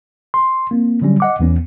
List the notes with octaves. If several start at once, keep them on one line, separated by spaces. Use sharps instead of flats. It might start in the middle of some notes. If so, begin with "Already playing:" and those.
C6
A#3 C4
D3 F#3 G3 C#4
D#5 F#5 D6
E2 E3 B3 C#4